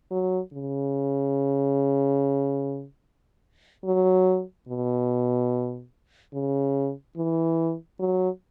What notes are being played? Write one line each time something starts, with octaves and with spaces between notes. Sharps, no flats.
F#3
C#3
F#3
B2
C#3
E3
F#3